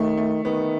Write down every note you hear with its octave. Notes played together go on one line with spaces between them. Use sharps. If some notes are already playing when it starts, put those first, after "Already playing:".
Already playing: D#3 A3
A3
D#3 B3